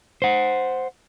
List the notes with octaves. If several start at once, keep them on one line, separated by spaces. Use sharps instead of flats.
C5 F#5